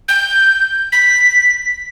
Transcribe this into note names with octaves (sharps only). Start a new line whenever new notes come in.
G6
B6